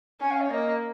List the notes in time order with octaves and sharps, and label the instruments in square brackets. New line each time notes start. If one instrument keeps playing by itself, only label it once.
[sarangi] C#4 [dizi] G#5
[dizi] F5
C#5
[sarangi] A#3 [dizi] D#5